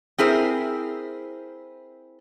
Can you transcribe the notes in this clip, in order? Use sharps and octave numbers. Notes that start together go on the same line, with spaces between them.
C4 E4 G#4 A#4 C5